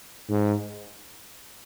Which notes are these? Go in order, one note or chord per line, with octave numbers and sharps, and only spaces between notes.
G#2